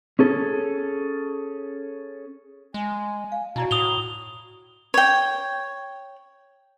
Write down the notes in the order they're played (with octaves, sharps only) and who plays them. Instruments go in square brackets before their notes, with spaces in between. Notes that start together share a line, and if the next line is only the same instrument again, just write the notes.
[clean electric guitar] C#4 G#4 A4
[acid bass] G#3 [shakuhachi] G#5
[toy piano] F5
[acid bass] B2 [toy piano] D#4 E4 D5 [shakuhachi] F#4
[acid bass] A2 [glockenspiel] D#6 F7 G7
[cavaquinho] C#5 G5